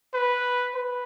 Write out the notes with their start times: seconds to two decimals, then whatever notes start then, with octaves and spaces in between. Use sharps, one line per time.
0.14 B4
0.75 B4